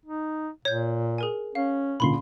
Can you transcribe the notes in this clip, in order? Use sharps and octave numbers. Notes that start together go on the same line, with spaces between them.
D#4
A#2 C#5 G6
G#4 A#4 G#5
C#4 F5
C#2 A#2 D3 B5 C6 C7